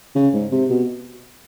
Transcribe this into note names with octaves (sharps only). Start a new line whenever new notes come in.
C#3
G#2
C3
B2